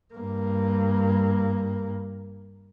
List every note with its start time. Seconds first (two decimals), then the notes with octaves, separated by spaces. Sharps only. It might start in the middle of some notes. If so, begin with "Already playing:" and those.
0.14 G2 A#3